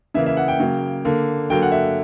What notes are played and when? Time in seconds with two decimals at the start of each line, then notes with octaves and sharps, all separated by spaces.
0.14 C#3 E3 A#3 E5
0.26 E5
0.37 F#5
0.48 G5
0.60 C#3 F#3 A#3
1.05 D3 A#3
1.50 D3 F#3 A#3 G5
1.63 F#5
1.72 E5